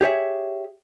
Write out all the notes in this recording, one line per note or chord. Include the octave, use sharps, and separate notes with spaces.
G4 G#4 C#5 E5